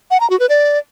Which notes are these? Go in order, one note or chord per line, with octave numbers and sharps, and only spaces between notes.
F#5
A#5
F#4
B4
D5